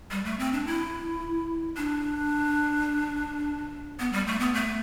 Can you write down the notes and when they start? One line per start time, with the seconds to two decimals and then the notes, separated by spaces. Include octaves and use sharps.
0.11 G3
0.25 A3
0.39 C4
0.53 D4
0.66 E4
1.77 D4
3.99 B3
4.13 G3
4.27 A3
4.40 B3
4.54 A3